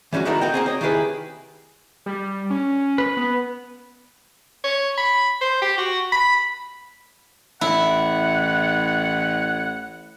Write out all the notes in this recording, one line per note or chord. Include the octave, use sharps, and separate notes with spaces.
E3 G3 C#4 D#4 F#4
D#3 A3 D#4 E4 F#4 A#4
D#4 F#4 G5
A#3 C4 G#4
C#5 D#5
D#3 A#3 E4 G4 G#4 B4
G3
C#4
B4
B3
C#5
B5
C5
G4
F#4
B5
A1 E4 F#5